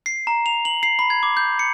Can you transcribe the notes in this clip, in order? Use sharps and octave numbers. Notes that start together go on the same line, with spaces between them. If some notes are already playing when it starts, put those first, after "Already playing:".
C7
A#5
F7
F#7
C7
B5
G#6
D6
G6
C#7